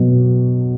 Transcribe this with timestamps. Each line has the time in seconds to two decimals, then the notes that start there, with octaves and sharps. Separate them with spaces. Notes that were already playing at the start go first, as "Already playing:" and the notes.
Already playing: B2 F#3